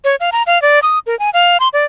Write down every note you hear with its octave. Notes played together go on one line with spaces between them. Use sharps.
C#5
F5
A#5
F5
D5
D#6
A#4
G#5
F5
C6
D5